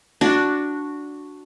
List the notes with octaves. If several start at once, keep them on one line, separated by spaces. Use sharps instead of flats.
D4 F#4